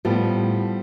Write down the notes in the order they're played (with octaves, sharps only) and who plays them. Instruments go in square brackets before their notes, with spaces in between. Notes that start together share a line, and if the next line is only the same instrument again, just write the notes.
[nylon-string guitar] A2 [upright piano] F3 G3 B3